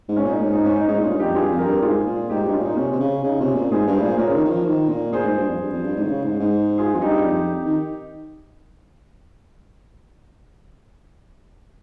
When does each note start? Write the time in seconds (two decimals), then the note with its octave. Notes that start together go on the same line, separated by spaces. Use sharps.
0.09 G#2
0.16 C#4
0.24 A#2 D#4
0.40 G#2 C#4
0.53 D#4
0.64 G#2 C#4
0.76 D#4
0.87 G#2 D#4
0.99 A#2 C#4 F4
1.11 G2
1.20 F2 D#4 G4
1.35 G2 F4 G#4
1.51 F2
1.58 G4 A#4
1.66 G2
1.82 G#2 F4 G#4
2.06 A#2
2.29 G#2 D#4 G4
2.41 G2 D#4 G4
2.53 C#4 F4
2.60 A#2 D#4
2.77 C3 C#4
2.92 C3
3.00 C#3
3.23 C#3 D#4
3.40 C3 C#4 F4
3.55 A#2
3.71 G#2 F4 G#4
3.86 G2
3.94 G#4 C5
4.02 A#2
4.18 A#2 A#4 C#5
4.29 C#3
4.34 D#3
4.44 D#3
4.51 F3
4.66 D#3
4.89 A#2
5.12 A#2 G#4 C5
5.25 G#2
5.37 G2
5.49 F2
5.60 G2
5.72 F2
5.84 G2
5.96 G#2
6.03 D#3
6.08 C#3
6.24 G#2
6.39 G#2
6.78 F4 G#4
6.94 F2 F4
7.01 G2 D#4 G4
7.26 F2
7.65 D#3